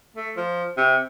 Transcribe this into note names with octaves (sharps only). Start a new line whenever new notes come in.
A3
F3
C3